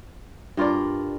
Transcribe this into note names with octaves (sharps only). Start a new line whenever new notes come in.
G2 F4 A#4 D5